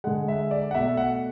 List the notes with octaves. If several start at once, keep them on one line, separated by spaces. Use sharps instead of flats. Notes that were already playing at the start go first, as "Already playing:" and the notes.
D3 G#3 F#5
E5
D5
F#5
B2 A3 E5
F#5